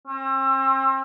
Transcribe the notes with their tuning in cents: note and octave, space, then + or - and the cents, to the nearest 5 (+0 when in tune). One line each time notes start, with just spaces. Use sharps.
C4 +40